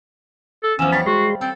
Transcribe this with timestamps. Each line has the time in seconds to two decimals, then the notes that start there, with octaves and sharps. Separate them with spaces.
0.63 A4
0.79 E2 F3 C#4 E6
0.92 G3 C#5 F5 A5 B5
1.06 G#3 F#4 C6
1.41 C4 A4